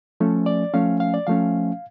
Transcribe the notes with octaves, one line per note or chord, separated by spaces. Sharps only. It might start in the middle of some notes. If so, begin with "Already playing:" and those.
F3 A3 C#4
D5
F3 A3 C#4 F5
F5
D5
F3 A3 C#4 F5